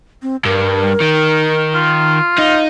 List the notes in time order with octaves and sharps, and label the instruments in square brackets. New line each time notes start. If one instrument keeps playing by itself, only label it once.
[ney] C4
[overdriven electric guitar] G2 [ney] A#4
[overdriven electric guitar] D#3
[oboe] F4
[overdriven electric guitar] D#4 [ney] F5